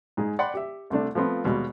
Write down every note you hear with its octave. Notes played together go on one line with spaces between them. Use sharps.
G#2 D#4 G#4
D5 F#5 G5 B5 C6 D6
G4 E5
C2 C3 A3 D4
F3 A3 B3 C4 F4
D#2 B2 G3 G#3